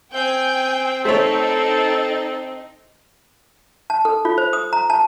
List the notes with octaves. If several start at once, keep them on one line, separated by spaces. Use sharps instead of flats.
C4 G5 G#5 G6
A3 D#4 A4 C5 C#5
A5
A4
F4
C5
D#6
A#5
A5